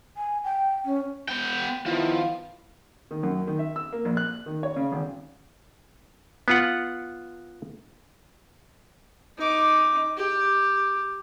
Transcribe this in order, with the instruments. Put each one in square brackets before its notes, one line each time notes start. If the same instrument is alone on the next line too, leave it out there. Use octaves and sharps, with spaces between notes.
[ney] G#5
G5
C#4
[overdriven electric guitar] B3 G5
[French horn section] D#3 B3 E4 [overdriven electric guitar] F3
[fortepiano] D#3
F#2
D#3
E5
E6
A#3
A#1
F#6
D#3
C#5
C#3
G#1
[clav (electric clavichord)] B3 F4 F#5
[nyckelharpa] D#4 D6
G4